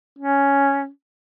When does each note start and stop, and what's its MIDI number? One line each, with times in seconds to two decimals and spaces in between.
0.19 0.88 61